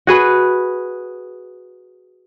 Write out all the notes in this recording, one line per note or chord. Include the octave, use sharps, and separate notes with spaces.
F#4 G#4 B4